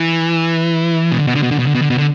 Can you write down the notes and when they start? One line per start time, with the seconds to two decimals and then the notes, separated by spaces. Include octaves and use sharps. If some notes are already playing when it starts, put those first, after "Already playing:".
Already playing: E3
1.12 B2
1.19 D3
1.27 B2
1.35 D3
1.43 B2
1.51 D3
1.59 B2
1.67 D3
1.74 B2
1.82 D3
1.90 B2
1.98 D3